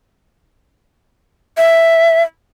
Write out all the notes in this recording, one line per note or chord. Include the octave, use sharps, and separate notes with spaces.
E5